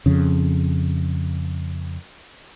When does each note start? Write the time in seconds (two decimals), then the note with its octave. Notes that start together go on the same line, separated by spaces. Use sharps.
0.06 F2 C#3